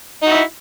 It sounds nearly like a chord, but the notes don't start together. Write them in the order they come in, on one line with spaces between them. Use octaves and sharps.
D#4 F#4 E4